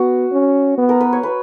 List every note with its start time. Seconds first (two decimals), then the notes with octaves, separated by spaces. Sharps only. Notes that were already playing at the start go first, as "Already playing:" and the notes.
Already playing: B3 F#4
0.32 C#4
0.78 B3
0.89 A#4
1.01 B4
1.13 C#5
1.23 B4